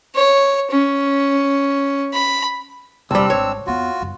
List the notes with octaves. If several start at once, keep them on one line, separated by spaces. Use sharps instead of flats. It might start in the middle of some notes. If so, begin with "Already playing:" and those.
C#5
C#4
B5
D#1 C2 G3 C4 D4 E6
G#1 C#5
F2 B3 F4 F#4
F#2 G3